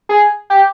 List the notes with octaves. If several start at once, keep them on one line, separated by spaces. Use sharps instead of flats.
G#4
G4